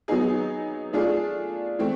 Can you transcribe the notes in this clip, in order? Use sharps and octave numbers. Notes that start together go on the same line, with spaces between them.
F#3 B3 D#4 G#4
A3 D4 F4 G#4
E3 A3 C4